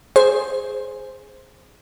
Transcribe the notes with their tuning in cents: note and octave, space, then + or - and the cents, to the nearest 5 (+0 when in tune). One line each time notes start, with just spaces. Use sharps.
G#4 +0 C5 +0